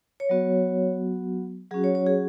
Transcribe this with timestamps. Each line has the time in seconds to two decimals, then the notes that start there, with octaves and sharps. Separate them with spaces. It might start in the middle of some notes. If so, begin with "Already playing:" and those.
0.20 C#5
0.29 F#3 B3 F#4
1.71 F#3 C#4 F#4 G#4
1.84 C#5
1.95 C#5
2.06 G#4